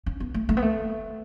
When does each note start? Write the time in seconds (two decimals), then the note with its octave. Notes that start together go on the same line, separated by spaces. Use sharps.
0.06 C#4
0.20 B3
0.34 A3
0.49 A3
0.57 B3
0.62 A3